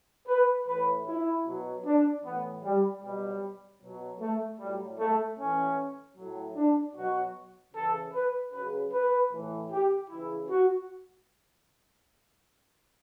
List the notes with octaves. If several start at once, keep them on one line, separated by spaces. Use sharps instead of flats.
B4
A2 E3 B4
E4
B2 F#3
D4
A2 E3 B3
G3
B2 F#3 G3
B2 F#3
A3
A2 F#3 G3
A3
A2 E3 C#4
A2 F#3
D4
B2 F#3 F#4
C#3 E3 A4
B4
C#3 F#3 B4
B4
A2 E3
G4
C#3 E3 E4
F#4